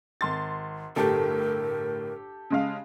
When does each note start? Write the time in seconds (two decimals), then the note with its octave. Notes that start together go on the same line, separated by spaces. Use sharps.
0.21 G#1 C6 A6
0.96 G1 A2 G4 A4 A#4
2.50 C#3 G#3 F5